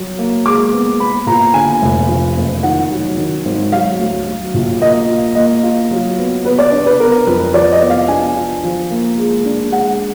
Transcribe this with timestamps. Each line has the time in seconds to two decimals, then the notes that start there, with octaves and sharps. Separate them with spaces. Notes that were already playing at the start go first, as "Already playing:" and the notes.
Already playing: F#3
0.19 A#3
0.45 G#3 D6
0.73 B3
1.00 B3 B5
1.26 A#2 A#5
1.54 D3 G#5
1.82 F1
2.08 F3
2.36 F#1
2.63 D#3 F#5
2.90 F#3
3.17 D#3
3.45 G#1
3.72 F#3 F5
3.99 D2
4.26 F#3
4.54 A#1
4.81 A#3 D#5
5.09 F4
5.35 A#3 D#5
5.63 F4
5.91 F#3
6.18 B3
6.45 B3 B4
6.59 D5
6.72 D4
6.86 B4
7.00 B3 A#4
7.27 F2 B4
7.54 F3 D5
7.72 D#5
7.81 B3
7.90 F5
8.08 D4 G#5
8.36 F4
8.63 F3
8.91 A#3
9.18 G#3
9.45 D4
9.72 G#3 F#5